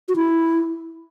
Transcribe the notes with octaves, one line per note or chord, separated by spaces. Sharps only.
F#4
E4